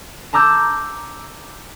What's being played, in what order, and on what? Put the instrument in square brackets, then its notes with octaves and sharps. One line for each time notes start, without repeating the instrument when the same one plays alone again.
[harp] A5 A#5 D6 E6 G6